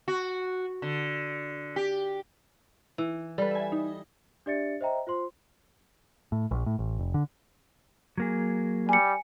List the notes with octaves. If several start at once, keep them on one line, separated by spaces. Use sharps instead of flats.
F#4
D3
G4
E3
G3 A4 B4
E5 G#5
D#4
D4 G4 D5 E5 A6 C#7
C5 D#5 E5 G5 A#5
F4 C5 C6
A2
A#1
A2
A1
F1
D3
F#3 A#3 G#4
G3 G#5 C#7